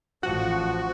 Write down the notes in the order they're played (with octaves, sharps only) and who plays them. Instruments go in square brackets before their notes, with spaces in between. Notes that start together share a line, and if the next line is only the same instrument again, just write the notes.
[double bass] A1 F3 [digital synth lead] F#4